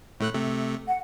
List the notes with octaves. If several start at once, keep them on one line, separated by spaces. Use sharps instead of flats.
A2 A3 F#6
C3 A3
F#5